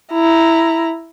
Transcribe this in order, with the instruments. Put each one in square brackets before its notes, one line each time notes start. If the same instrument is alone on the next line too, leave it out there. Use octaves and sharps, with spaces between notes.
[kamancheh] E4 A#5